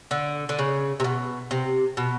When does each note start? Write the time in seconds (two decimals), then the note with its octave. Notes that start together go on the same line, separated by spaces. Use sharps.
0.11 D3
0.49 D3
0.59 C#3
1.00 C3
1.04 B2
1.51 C3
1.97 B2